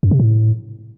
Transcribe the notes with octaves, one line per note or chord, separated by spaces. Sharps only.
F#2
C3
A2